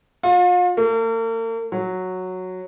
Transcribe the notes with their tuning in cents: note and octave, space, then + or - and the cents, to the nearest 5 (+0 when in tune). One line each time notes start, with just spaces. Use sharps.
F4 +40
A#3 -45
F#3 -5